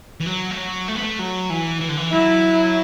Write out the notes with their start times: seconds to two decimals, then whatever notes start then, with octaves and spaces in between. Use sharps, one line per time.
0.20 E3
0.26 F#3
0.51 A3
0.57 F#3
0.88 A3
0.95 B3
1.02 A3
1.19 F#3
1.50 E3
1.81 E3
1.89 D3
1.97 E3
2.12 F#3 E4